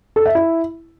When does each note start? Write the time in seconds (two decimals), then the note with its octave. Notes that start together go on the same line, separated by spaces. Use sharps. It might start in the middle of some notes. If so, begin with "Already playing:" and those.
0.16 A4
0.25 E5
0.35 E4